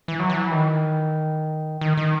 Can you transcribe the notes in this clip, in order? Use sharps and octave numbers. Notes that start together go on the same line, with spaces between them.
E3
F#3
E3
D#3
D#3
D#3